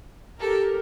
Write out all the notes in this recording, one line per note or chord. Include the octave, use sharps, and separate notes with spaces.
G4 A4 A#4